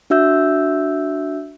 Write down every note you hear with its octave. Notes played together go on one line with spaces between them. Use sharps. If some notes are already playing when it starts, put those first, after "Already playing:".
D4 F#4 E5 E6 G6